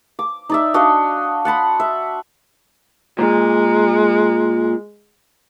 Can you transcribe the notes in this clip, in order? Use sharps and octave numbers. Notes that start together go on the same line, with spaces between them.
D6
D#4 D5 E5
D4 F#4 D#5 F5
F#5 A5 B5 C6
E5
A#2 G#3